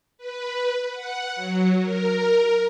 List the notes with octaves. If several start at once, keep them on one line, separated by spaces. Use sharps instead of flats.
B4
F#5
F#3
A#4